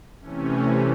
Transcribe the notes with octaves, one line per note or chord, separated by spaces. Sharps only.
C3 E3 A3 C#4